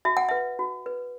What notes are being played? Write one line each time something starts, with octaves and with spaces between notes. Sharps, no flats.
F#4 E5
F#5
B4 E5
F#4
B4